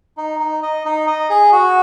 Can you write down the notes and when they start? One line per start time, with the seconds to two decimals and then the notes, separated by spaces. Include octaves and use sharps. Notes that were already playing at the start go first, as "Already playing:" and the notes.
0.17 D#4
0.40 D#4
0.62 D#5
0.85 D#4
1.07 D#5
1.30 G#4
1.52 F#4